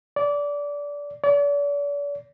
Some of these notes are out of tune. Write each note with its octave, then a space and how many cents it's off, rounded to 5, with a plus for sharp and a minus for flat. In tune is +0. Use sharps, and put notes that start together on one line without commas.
D5 -20
D5 -40